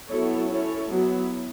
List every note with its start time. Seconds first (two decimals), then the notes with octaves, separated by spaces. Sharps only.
0.09 F#3 B3 E4 A4 C#5
0.49 C#4 E4 A4 C#5
0.88 F#3 B3 E4